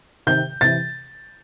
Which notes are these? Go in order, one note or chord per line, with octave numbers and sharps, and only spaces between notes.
C3 D#3 G6
C3 E3 A6